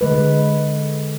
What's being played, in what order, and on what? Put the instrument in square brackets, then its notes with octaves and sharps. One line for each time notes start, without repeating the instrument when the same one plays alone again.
[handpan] D3 G#3 B4